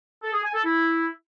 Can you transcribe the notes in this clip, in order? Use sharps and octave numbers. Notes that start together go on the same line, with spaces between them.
A4
G#4
G#5
A4
E4